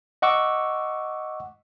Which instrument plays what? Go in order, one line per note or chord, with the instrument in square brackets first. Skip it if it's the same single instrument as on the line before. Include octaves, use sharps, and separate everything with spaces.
[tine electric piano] D#5 F#5 C#6 D6 E6